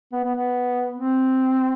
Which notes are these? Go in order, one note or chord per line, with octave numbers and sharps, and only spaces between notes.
B3
B3
B3
C4